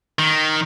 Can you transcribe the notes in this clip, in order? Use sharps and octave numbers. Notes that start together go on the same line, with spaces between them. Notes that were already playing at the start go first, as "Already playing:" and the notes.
D#3